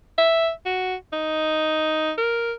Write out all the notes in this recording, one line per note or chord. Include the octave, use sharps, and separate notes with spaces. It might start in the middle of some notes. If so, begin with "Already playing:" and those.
E5
F#4
D#4
A#4